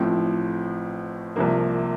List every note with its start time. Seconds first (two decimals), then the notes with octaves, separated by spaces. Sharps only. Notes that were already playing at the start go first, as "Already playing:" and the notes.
Already playing: A1 A2 F3 C4
1.36 C2 C3 F3 A#3